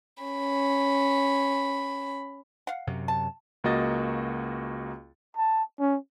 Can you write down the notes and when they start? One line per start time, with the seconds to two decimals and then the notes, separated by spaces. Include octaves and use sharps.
0.24 C#4 B5
2.67 F5 F#5
2.87 F#2 C3 F#3
3.08 A5
3.64 C#2 A#3 F#4 D#5 A6
5.37 A5
5.79 C#4